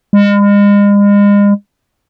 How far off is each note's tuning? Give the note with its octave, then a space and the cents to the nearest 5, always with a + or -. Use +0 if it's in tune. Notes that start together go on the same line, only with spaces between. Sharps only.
G#3 -40